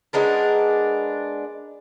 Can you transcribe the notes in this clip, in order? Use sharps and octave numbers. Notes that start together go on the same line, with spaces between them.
G#3 B3 D4 A#4